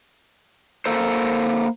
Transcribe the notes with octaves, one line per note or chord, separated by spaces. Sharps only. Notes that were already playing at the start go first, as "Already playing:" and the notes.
A#3 A4 C5